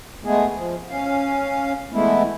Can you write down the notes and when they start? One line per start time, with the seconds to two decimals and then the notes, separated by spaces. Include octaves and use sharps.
0.24 G#3 A3 B3 G#4
0.55 F3
0.89 C#4 F5
1.92 E3 G#3 A3 B3 E4